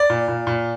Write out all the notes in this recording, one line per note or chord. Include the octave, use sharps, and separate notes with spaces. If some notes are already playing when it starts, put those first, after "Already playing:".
Already playing: D5
A#2
A#2
A#2